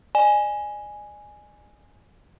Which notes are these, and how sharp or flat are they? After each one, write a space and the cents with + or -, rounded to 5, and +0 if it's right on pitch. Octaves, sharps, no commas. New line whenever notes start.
D5 +40 G#5 +0